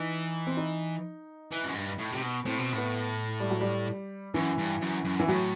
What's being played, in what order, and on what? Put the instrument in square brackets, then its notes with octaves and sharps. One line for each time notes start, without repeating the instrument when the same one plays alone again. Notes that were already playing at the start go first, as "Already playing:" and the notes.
Already playing: [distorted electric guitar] E3 [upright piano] D#4
[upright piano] C4
D#4
[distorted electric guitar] E3
F#2
G2
A2
C3
B2
[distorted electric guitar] A2 [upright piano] C4
[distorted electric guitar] B2
[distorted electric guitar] A2 [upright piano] B3
[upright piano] G3
F#3
G3
[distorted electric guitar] F#2 [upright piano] E3
[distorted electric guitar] G2
F#2
F#2
[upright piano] E3
[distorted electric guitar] A2 [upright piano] F#3